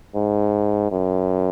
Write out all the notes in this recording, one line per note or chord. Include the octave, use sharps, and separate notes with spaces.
G#2
F#2